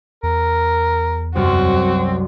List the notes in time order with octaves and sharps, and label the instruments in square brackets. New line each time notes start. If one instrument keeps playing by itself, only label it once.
[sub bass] E2 [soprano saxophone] A#4
[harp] C2 F#2 F6 [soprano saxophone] C4 [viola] F#4